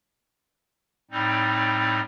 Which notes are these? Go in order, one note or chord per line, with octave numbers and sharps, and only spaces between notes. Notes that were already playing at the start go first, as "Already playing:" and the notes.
A2 G3 C4 D#4